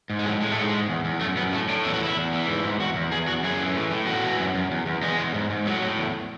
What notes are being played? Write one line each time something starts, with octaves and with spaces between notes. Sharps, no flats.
G#2
G#3
A2 F#3
A2 G#3
A3
G#2 G#3
G#2
E2
E2
F#2 A3
F#2 B3
A2 A3
A2 D4
E2 E4
F#4
E2 E4
E2
E3
G#2
G#2
E2 F#4
E2
E2 G#4
E2 F#4
F#2 G#4
E3
A2
A2
E2 F#4
E3
F#2
F#2
E2
E2
E2 G#3
E2
G#2
G#2
A2 F#3
A2
E2